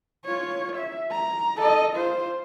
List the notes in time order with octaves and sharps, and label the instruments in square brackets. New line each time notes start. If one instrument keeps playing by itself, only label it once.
[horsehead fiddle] F4 C#5
E5
A#5
A4 D#5
F4 C5